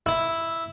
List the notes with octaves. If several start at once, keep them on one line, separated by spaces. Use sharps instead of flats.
E4